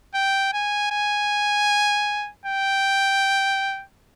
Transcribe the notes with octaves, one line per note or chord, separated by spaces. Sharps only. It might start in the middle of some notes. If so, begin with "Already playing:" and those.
G5
G#5
G#5
G5